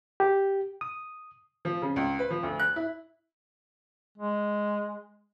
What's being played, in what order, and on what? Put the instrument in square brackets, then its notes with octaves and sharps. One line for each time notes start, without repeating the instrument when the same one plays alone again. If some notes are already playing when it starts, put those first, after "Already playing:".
[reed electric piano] G4
D#6
[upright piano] F3
C#3
C#2
B4
F3
D2
F#6
E4
[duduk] G#3